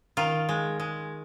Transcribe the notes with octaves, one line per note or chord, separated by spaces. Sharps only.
D#3 F4
G#3
G#3